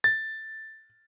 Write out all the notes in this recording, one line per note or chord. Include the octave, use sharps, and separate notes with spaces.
A6